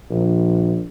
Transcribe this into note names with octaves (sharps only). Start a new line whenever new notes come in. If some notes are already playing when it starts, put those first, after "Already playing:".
A#1